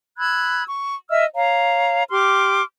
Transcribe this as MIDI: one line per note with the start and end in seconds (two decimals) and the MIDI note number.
0.18 0.63 83
0.18 0.63 88
0.18 0.63 90
0.18 0.63 92
0.68 0.95 85
1.10 1.25 75
1.10 1.25 76
1.10 1.25 88
1.10 1.25 89
1.35 2.03 73
1.35 2.03 77
1.35 2.03 82
2.11 2.61 67
2.11 2.61 84
2.11 2.61 86
2.11 2.61 89